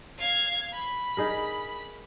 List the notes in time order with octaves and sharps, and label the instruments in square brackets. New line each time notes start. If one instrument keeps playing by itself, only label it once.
[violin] F5 G#6
B5
[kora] D#4 G#4 A#4